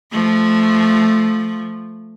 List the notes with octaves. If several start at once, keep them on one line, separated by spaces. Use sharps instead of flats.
F3 A3